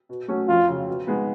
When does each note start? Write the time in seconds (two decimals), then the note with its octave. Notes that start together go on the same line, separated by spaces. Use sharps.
0.09 B2
0.28 F#3 A3 C#4 F#4
0.48 F2 F4
0.68 C#3 F#3
0.88 B2
1.07 G#3 B3 D#4